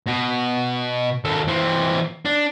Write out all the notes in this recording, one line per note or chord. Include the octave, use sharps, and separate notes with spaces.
B2
D#2 A4
E3 C4
D4